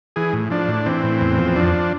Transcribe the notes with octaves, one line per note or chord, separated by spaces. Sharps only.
E3 G#4
A2
F3 D4
A2
E3 C4
A2
E2
F3
F2 D4
F3